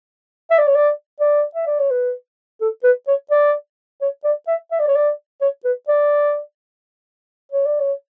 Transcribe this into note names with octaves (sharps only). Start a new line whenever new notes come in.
E5
D5
C#5
D5
D5
E5
D5
C#5
B4
A4
B4
C#5
D5
C#5
D5
E5
E5
D5
C#5
D5
C#5
B4
D5
C#5
D5
C#5